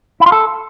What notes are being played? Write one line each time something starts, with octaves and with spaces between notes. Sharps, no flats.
E4
F4
A4